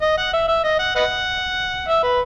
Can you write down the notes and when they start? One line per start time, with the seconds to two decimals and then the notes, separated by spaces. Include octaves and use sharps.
0.01 D#5
0.18 F#5
0.33 E5
0.48 E5
0.64 D#5
0.79 F#5
0.96 B4 D#5 F#5
1.88 E5
2.03 B4